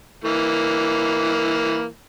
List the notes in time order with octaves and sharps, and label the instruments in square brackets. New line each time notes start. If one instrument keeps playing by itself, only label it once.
[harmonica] E3 A#3